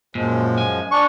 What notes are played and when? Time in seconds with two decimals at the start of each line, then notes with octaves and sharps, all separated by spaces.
0.15 F#2 A#2 F3 G#3
0.58 G#5
0.91 D4 C#6